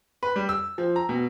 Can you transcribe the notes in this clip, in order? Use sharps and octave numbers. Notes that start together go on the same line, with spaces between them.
B4
G3
E6
F3
A#5
B2